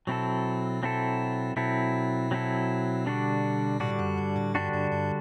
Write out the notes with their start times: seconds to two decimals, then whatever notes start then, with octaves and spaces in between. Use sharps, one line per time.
0.07 B2 F#3 C4 E4 A4
0.83 F#3 C4 E4 A4
1.57 B2 F#3 C4 E4 A4
2.31 F#3 C4 E4 A4
3.06 D3 G3 D4 F#4
3.80 A2 D3 G3 D4 F#4
3.99 F#2
4.18 G2
4.36 A2
4.55 G2 D3 G3 D4 F#4
4.73 G2
4.92 G2